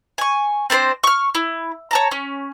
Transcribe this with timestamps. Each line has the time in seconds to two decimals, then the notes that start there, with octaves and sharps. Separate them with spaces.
0.18 G#5 C#6
0.70 C4 D4 A#4 C5
1.03 C#6 F6
1.35 E4
1.91 C#5 A5 A#5
2.11 C#4